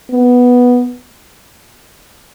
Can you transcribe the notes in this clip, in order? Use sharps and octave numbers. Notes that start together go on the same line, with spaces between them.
B3